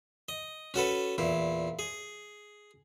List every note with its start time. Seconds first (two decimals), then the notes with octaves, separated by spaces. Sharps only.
0.29 D#5
0.74 C#4 F#4 A4 B4
1.18 E2 A#2 E4
1.79 G#4